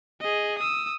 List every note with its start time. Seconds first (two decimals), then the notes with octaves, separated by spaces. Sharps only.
0.21 G#4 D#5
0.59 D#6 E6